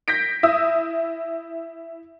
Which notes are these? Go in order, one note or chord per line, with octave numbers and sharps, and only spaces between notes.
G6 A#6 B6 D7
E4 D#6 E6